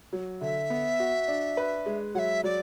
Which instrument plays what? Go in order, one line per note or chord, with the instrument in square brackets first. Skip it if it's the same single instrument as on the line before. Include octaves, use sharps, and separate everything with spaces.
[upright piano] F#3
[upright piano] D3 [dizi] E5
[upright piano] B3
F#4
D4
B4
G#3
[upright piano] F#3 [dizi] F#5
[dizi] E5
[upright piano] F#3 [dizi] D5